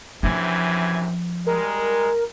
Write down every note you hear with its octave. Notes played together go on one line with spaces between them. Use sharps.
F#2 C3 E3 F3 D4 G#6
G3 G#3 A#4